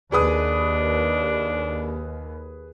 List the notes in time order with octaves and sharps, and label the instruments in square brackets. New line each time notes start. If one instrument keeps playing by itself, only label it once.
[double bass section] D#2 [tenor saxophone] D4 [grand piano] G#4 B4 D#6